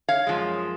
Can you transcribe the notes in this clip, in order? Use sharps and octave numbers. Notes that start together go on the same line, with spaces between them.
C#5 F5
F#2 F3 G#3